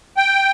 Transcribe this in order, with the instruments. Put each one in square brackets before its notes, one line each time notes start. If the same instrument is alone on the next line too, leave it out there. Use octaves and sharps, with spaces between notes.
[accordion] G5